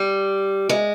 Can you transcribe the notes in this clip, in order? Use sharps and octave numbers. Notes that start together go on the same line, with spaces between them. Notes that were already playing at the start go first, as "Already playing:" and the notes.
Already playing: G3
G#3